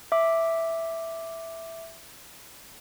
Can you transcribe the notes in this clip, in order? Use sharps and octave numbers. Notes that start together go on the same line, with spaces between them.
E5 D6